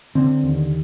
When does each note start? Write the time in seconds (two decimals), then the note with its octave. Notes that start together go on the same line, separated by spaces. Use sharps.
0.15 D3 C4
0.43 D#2